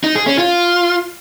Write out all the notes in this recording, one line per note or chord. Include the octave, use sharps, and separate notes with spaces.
D#4
G#4
C#4
F4